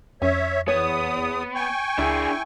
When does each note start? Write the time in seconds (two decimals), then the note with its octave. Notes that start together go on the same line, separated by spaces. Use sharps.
0.22 F2 C#4 C#5 E5
0.68 E2 B3 C#5 D#6
1.55 G5 G#5 C#6
1.98 C#2 D4 E4 G#4